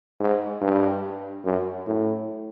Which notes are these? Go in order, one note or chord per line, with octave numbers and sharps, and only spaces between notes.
G#2
G2
F#2
A2